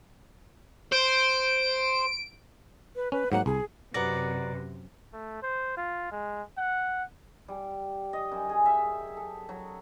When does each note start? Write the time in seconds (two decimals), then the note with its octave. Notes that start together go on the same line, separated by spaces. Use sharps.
0.92 C5 D7
2.96 B4
3.12 C#4 B4
3.32 G#2 F#3 A#3 F#5
3.46 C2 G#4
3.94 F#2 C3 D#4 F#4 B4 D5 A#6
5.13 A3
5.42 C5
5.77 F4
6.12 G#3
6.58 F#5
7.48 G3
8.13 D#5
8.31 F#2
8.49 G#4
8.66 E5
9.17 A4
9.49 F#3